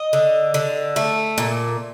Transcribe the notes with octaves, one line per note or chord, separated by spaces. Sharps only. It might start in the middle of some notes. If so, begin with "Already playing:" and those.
Already playing: D#5
D3
D3
A3
A#2